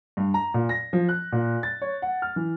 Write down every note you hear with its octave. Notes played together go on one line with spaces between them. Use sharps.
G2
A#5
A#2
A#6
F3
F#6
A#2
A6
C#5
F#5
F6
E3